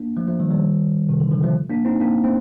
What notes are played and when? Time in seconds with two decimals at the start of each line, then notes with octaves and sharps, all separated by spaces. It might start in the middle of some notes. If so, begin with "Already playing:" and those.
Already playing: A#3 D4
0.17 F3 A3
0.28 F3 A3
0.40 D#3 G3
0.51 D#3 G3
1.09 C3 D#3
1.20 D3
1.31 D3 F3
1.43 F3 A3
1.70 A#3 D4
1.85 C4 D#4
2.00 A#3 D4
2.24 A3 C4